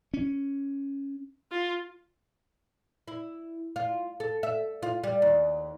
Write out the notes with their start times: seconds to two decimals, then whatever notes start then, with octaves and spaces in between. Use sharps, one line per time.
0.14 C#4
1.52 F4
3.08 E4
3.76 F4
4.20 A4
4.43 E5
4.83 F4
5.04 G3
5.22 D#2